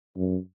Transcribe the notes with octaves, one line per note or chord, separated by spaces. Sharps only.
F#2